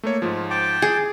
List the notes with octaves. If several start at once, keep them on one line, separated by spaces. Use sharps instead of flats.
A3 A#3 C#5
G#2 F3
G5 A5 D6
G#4